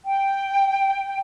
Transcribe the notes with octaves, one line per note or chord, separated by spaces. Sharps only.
G5